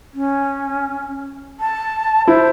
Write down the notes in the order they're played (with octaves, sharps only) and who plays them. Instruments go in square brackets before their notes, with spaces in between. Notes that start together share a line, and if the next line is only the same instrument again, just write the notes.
[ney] C#4
A5
[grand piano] E4 [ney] C5